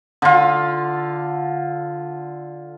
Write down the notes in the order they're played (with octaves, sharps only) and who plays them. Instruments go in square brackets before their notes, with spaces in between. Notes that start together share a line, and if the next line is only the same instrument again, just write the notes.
[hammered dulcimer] D3 F4